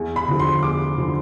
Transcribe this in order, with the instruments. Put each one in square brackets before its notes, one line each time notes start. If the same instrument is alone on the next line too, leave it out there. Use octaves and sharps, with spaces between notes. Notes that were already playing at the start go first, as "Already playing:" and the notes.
Already playing: [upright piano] E2
B5
D3 F3
C6
E2 D6
D3 F3